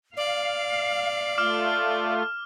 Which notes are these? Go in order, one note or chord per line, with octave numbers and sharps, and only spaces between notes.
D5 F5
A3 F4 D6 F6